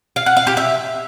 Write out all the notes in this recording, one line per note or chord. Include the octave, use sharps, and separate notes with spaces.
F5
F#5
F5
G4
E5